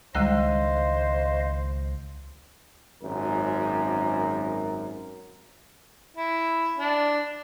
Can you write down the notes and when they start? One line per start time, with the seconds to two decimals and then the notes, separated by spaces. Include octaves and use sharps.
0.15 C#2 D#3 G3 G#3 C5 D#5 F5 A#5
3.03 G#1 F#2 A#4
6.17 E4
6.78 D4